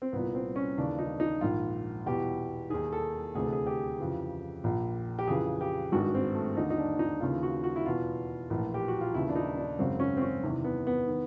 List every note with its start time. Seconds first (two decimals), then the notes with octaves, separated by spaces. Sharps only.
0.02 C4
0.13 C2 A#2 B3
0.35 C4
0.56 C#4
0.78 D#2 C#3 E3 D4
0.99 D#4
1.20 D#4
1.41 A#1 G#2 D#3 F4
2.06 E2 B2 G4
2.70 D#2 D#3 G#4
2.93 A4
3.35 D2 C3 E3 G#4
3.45 A4
3.53 G#4
3.67 G4
3.99 F2 C#3 E3
4.64 A#1 A#2
5.19 G4
5.27 F2 C#3 E3 G#4
5.61 G4
5.92 G#1 G2 D#3 F#4
6.15 C4
6.35 A3
6.57 D#2 D3 D#4
6.70 D#4
6.78 D4
6.99 D#4
7.21 D#2 C#3 E3 F4
7.43 F#4
7.64 F#4
7.76 E4
7.86 E2 B2 F4
8.50 A#1 A2 E3
8.74 G4
8.88 F#4
9.01 F4
9.14 D#2 C#3 E3 E4
9.29 D4
9.36 D#4
9.57 D4
9.79 G#1 F#2 C#3 C4
10.00 C#4
10.17 C4
10.22 C#4
10.43 E2 C3 D#3
10.64 B3
10.87 B3
11.08 D#3